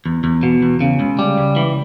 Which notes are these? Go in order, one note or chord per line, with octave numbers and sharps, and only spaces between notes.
E2
E2
B2
E2
C#3
C#2
G3
C#2
E3